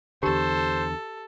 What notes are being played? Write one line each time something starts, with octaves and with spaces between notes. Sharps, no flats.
E2 D3 G4 A4 C5